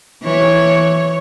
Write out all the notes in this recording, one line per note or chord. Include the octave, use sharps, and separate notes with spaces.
E3 C#5